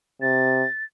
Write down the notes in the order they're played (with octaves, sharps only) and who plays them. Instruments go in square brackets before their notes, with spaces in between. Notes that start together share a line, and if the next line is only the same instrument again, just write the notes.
[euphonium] C3 [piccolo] A6